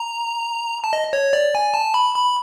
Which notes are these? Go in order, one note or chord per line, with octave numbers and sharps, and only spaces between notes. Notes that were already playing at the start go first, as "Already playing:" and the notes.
Already playing: A#5
A5
D#5
C#5
D5
G#5
A5
B5
B5